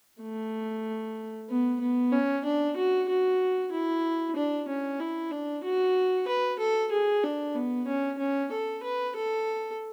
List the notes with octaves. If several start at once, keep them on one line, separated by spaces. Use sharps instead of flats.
A3
B3
B3
C#4
D4
F#4
F#4
E4
D4
C#4
E4
D4
F#4
B4
A4
G#4
D4
B3
C#4
C#4
A4
B4
A4